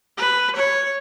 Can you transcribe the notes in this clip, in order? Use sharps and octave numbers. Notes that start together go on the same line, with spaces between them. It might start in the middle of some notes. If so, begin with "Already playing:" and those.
B4
C#5